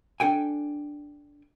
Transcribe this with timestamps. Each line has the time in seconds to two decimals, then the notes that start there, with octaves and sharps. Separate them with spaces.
0.20 D4 A4 G5 G#5